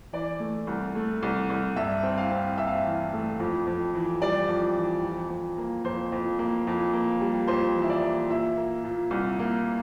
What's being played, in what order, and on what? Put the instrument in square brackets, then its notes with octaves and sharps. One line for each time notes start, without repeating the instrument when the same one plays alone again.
[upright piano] E3 D5
A3
C2
A3
C2
C2
G2 E5
C4
F5
C4
C4 E5
F5
E5
E3
A3
F2
F2
E3
G3 D5
F2
E3
F2
F2
A#3
F2 C5
F2
A#3
F2
A#3
G3
F2 C5
E3
E5
D5
A#3
A#2 E5
A#3
A#2
C2
A#3